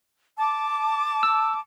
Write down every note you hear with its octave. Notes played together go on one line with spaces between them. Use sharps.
A5 D6
E6